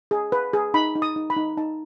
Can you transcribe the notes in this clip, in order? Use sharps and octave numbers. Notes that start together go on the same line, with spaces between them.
G#4
B4
G#4
D#4 B5
D#4
D#6
D#4
B5
D#4
D#4 A5